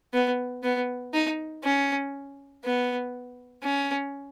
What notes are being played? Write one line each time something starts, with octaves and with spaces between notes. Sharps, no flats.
B3
B3
D#4
C#4
B3
C#4